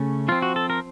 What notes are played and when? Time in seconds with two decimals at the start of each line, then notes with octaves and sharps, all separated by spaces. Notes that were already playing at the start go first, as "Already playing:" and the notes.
Already playing: C#3 A3 C#4
0.28 F3 C4 F4
0.42 F#4
0.56 A4
0.70 A#4